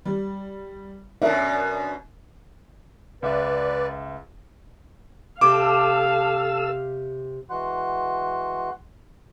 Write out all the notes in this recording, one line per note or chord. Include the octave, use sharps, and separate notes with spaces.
G3
F#2 B2 C#4 D4 A#4 E5
C#2 B4 D5 E5
C3 A4 F5 D6 E6
E3 G#3 F#4 F#5 C6 F#6